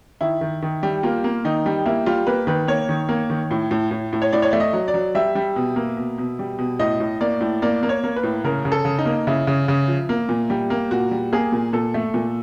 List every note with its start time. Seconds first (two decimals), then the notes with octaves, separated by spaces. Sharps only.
0.21 D#3 E4
0.41 D#3
0.62 D#3
0.83 G3
1.03 A#3 F4
1.24 A#3
1.45 D#3 D#4
1.66 G3
1.86 A#3 E4
2.06 G3 F4
2.27 A#3 B4
2.47 D#3 B4
2.67 A#3 C#5
2.89 D#3
3.09 A#3
3.30 D#3
3.51 A2
3.71 A2
3.91 A2
4.13 A2
4.22 C#5
4.32 A2 D5
4.42 C#5
4.51 A3 D5
4.60 D#5
4.73 F#3
4.88 D5
4.94 F#3
5.15 G3 E5
5.35 G3
5.56 B2
5.76 A#3
5.97 B2
6.18 B2
6.39 G3
6.59 B2
6.80 A2 D#5
7.00 A2
7.21 A#3 D5
7.41 A2
7.62 A#3 D5
7.83 A#3
7.89 C#5
8.04 A#3
8.16 B4
8.23 A2
8.44 C#3 A#4
8.65 C#3
8.72 A4
8.85 C#3
8.99 D#4
9.06 A#3
9.27 C#3 E4
9.47 C#3
9.68 C#3
9.88 F3
10.09 A#3
10.29 A#2
10.50 G3
10.70 A#3
10.91 A#2 F#4
11.11 G3
11.33 A#3 G#4
11.52 A#2
11.73 A#2 A4
11.94 A3
12.14 A#2